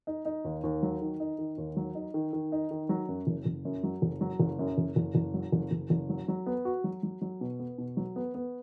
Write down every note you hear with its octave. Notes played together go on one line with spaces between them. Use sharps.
D#4
D#4
D#2
D#2
F#3
D#3
D#4
D#3
D#2
F#3
D#4
D#3
D#3
D#4
D#3
F#3
F#2
F#1
F#1
F#2
F#3
F#1
F#3
F#1
F#2
F#1
F#1
F#1
F#3
F#1
F#1
F#1
F#3
F#3
B3
F#4
F#3
F#3
F#3
B2
B3
B2
F#3
B3
B3